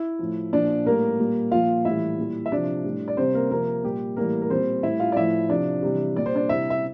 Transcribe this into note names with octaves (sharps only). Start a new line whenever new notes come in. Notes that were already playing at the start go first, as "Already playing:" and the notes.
Already playing: E4 E5
A2 F3
A#2 F3 D4 D5
A2 G3 A#3 A#4
A#2 G3
A#2 F3 F4 F5
A2 E3 G3 E4 E5
A#2 G3
E5
C3 F3 D4 D5
A2 G3
D5
C3 G3 C4 C5
A#3 A#4
C3 F3 A#3 A#4
A#2 G3 G4
A2 E3 G3 A#3 A#4
A#4
A#2 G3 C4 C5
A2 G3 E4 E5
F4 F5
D5
A2 F3 E4 E5
C3 F3 D4 D5
C3 E3 G3
A#2 G3 D5
C5
D4 D5
C3 G3 E4 E5
E5